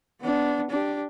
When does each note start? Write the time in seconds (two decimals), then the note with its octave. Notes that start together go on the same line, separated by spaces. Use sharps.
0.22 B3 D4
0.70 D4 G4